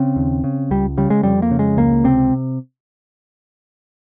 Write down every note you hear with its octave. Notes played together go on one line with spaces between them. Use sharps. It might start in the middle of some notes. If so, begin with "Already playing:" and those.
Already playing: C#3 C4
D#2
C#3
C#2 G3
C#3 G3
G#3
F2 G3
A#3
C#3
G#3
C#2 A#3
C3 C4